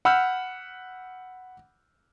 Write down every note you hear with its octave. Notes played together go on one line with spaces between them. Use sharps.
F#5 B5 E6 F6 G6